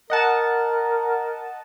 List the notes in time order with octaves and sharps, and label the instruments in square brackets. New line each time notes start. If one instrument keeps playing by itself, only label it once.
[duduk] A#4 [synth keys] D#5 F#5 A5